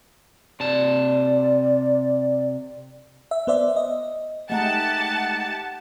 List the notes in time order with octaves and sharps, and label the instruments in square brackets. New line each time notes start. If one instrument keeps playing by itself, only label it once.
[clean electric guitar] C3 A5 [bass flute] D5
[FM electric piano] E5
B3 C5 D5 E5
D#5
[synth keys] G#3 A3 D#4 [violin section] G4 A5 [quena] F#5